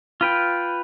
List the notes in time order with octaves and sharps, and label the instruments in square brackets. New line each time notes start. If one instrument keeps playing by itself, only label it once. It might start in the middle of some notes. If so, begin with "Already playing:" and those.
[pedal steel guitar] F4 B4 G5